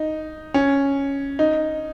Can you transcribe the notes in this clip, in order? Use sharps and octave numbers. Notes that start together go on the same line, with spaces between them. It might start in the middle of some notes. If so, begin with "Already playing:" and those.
Already playing: D#4
C#4
D#4